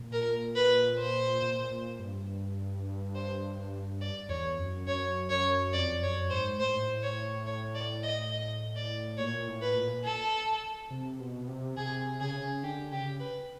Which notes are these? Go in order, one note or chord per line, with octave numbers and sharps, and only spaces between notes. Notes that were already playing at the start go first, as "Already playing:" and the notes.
Already playing: A#2
A#4
B4
C5
A#2
A#2
G2
C5
D5
E2 C#5
F#2
F#2 C#5
F#2 C#5
F2 D5
F#2 C#5
G#2 C5
A2 C5
C#5
C#5
D5
D#5
D#5
D5
A#2 C#5
A2
B4
A#2
A4
C3
B2
C3
C3 G#4
C#3 G#4
D3 G4
C#3 G4
B4